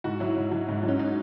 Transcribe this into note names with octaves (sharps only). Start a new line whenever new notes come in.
G#2 F#4
F#3 E4
G#2
F#3
G#2
F#3
C#4
D#4